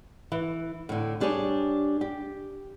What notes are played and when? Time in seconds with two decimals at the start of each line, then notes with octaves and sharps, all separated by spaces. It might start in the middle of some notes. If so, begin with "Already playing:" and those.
0.32 E3
0.89 A2 D3
1.20 G3 D4 G4 G#4 C#5
2.01 G4